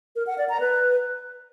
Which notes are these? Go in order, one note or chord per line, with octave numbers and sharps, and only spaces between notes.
A#4
F#5
D5
A#5
B4